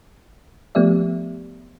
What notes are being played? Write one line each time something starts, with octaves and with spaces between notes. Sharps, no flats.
F3 A3 B3 G4 D5 E5